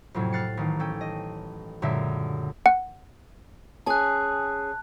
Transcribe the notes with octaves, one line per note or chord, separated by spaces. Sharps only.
F2 A2 C3 F#3
F6 F#6 A6 C7 C#7
A1 D#3
C#4 A4 G5
D#5
C#2 F#2 A#2 D3 E5
F#5
C#4 G#4 A5 F#6